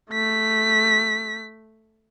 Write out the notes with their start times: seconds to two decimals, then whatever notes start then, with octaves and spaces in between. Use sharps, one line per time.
0.11 A3 B6